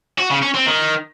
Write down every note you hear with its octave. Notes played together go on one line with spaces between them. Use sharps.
F#4
C#3
C#4
C4
D#3